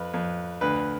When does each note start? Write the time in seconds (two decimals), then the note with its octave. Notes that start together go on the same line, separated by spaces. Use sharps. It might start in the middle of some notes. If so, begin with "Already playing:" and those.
Already playing: F2 B4
0.14 F2
0.61 D2 B4